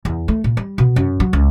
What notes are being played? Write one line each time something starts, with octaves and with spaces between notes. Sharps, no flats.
E2
A3
A#2
G3
B2
F#2
F#3
C#2